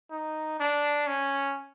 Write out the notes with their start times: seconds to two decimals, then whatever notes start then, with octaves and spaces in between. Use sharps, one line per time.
0.11 D#4
0.60 D4
1.07 C#4